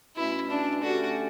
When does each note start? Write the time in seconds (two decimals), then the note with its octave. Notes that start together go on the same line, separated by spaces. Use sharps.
0.16 B2 A3 C#4 E4
0.50 D4
0.83 D3 A3 C#4 F#4 G4 D5